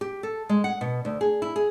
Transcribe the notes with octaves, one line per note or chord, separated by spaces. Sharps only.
G4
A4
G#3
F#5
B2
D2
G#4
E4
G#4